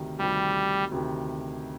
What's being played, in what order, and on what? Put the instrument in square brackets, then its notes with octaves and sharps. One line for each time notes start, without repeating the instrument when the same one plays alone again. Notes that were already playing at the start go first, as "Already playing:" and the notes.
Already playing: [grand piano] D2 C3 D#3
[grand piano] D2 C3 D#3 [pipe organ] G3
[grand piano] D2 C3 D#3